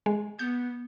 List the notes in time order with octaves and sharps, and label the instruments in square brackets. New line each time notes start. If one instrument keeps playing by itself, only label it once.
[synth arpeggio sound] G#3
[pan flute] B3 [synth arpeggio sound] G6